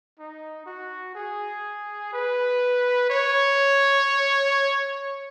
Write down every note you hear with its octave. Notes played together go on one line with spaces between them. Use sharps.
D#4
F#4
G#4
B4
C#5